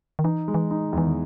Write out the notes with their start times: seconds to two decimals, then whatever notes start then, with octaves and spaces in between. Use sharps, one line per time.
0.19 D#3
0.24 E3 D#4
0.48 G#3
0.54 E3
0.71 D#4
0.85 D#3
0.93 E2
0.98 E3
1.06 D#3